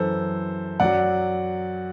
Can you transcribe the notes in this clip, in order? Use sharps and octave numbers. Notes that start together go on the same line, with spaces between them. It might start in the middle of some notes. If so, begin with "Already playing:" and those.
Already playing: F#2 E3 A4 C5
F#2 F#3 D5 F#5